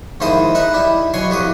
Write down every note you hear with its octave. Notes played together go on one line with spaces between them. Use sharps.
D#2 G#2 F3 E4 C5 D#6
D#4 B4 E5 B5
G3 E4
B2 F#3 C#5 G#5 C6
C2 F2 F#4 G4 D#6